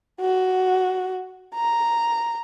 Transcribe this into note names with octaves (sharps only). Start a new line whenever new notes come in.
F#4
A#5